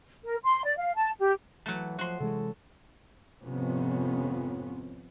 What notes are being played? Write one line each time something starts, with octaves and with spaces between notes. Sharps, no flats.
A#4
C6
D5
F5
A5
G4
E3 F#3 A3
F3 F#4 C6
C3 E3 G#3 A4
G#1 F2 C3 F3 B3 C#4